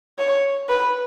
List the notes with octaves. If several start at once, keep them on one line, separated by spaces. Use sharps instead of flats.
C#5
B4